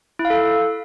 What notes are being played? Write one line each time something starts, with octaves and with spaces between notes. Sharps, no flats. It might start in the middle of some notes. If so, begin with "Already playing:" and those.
E4
F5
A4